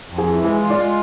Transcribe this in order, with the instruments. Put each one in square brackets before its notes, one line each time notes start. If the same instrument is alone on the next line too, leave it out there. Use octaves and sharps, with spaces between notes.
[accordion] F2
[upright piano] G#4
[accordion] E3
[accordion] G#3 [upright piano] G#4
[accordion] F4
[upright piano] D5
[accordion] G#3